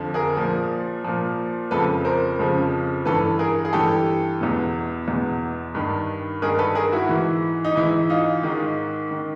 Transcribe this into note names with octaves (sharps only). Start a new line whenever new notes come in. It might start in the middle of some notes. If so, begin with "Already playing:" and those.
Already playing: F2 D3 F3
G#4 A#4
A#2 F3
A#2 F3
F2 C#3 F3 A4 B4
A#4 C5
F2 C#3 F3
G2 E3 A4 B4
G#4 A#4
G#4
G2 E3 G4 A4
E2 B2
E2 B2
G2 D#3
G2 D#3 G#4 A#4
A4 B4
G#4 A#4
E4 F#4
G#2 E3
D#4
G#2 E3 E4
D#4 F4
G#2 D#3
D#3